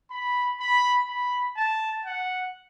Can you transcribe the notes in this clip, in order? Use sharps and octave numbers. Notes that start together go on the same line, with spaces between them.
B5
B5
B5
A5
F#5